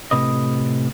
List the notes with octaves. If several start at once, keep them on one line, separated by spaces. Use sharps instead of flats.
A2 C3 B4 D#5